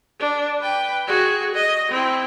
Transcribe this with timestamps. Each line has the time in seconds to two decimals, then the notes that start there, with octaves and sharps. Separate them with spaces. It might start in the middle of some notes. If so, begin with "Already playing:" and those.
0.20 D4
0.61 B4 G5
1.07 F#4 G#4
1.55 D#5
1.91 C4 E4